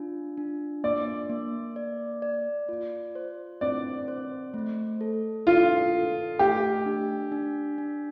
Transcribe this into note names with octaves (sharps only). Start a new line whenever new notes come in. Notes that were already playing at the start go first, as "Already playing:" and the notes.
Already playing: D4 F4
D4
A#3 D5
A#3
D5
D5
F4
C5
C4 D5
C5
A3
A4
F4 A4
A4
A3 G4
D4
D4
D4